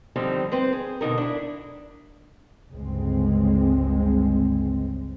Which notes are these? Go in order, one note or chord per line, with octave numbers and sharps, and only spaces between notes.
D3 D#3 F3 G3 C4 D#4
C4 B4 C5
G#4
B2 D3 D#4 A#4
D4 E4
G1 C#2 G#3 C4